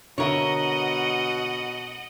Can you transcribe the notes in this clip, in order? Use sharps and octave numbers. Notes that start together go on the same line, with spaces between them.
B2 D3 A#4 C#5 D#5 E5 F#5